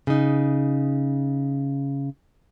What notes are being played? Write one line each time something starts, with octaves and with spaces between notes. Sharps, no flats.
C#3 D#4